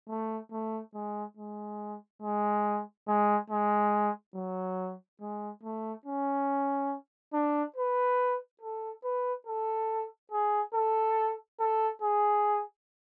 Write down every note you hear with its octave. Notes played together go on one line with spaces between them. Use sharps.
A3
A3
G#3
G#3
G#3
G#3
G#3
F#3
G#3
A3
C#4
D4
B4
A4
B4
A4
G#4
A4
A4
G#4